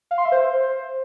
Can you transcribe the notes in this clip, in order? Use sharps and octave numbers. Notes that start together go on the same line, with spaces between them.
F5
C6
E5
C5